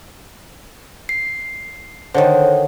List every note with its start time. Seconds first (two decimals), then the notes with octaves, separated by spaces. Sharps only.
1.09 C7
2.14 D3 D#3 C5 C#5